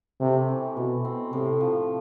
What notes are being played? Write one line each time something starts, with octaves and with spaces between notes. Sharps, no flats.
C3 A3
E3
B2 E3
C4
A2 C3
F3